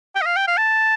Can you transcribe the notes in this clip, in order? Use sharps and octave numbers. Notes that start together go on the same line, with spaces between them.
G5
D#5
F5
G5
F5
A5